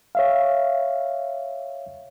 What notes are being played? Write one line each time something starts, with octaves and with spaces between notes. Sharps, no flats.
C#5 E5 F5